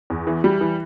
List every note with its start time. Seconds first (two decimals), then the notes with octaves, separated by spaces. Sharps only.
0.10 E2
0.27 E3
0.44 G3
0.61 E3